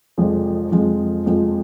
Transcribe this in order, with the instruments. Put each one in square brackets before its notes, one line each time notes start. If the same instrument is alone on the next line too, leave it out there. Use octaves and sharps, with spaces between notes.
[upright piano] F1 F2 F3 G#3
F1 F2 F3 G#3
F1 F2 F3 G#3